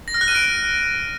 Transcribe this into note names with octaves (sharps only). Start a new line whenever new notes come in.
A#6
F6
F#6
D#7
D7